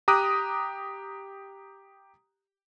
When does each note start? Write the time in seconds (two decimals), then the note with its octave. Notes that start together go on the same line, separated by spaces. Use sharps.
0.08 G4 A#5 D6 D#6 F#6